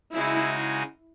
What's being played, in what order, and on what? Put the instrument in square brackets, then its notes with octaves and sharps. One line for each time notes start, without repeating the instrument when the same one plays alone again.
[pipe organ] C#3 G#3 D#4 F#4 [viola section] E4